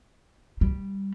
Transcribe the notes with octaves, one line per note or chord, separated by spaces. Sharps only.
G3